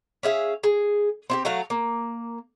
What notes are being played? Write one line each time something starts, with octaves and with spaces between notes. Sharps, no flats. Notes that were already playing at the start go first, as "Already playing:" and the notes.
C#4 G#4 E5 F5
G#4
C4 E4 G4
F#3 A3 F#4 F5
A#3